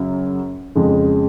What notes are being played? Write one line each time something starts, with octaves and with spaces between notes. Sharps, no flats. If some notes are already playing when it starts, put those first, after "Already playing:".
Already playing: F#2 C#3 F#3
F2 C#3 G#3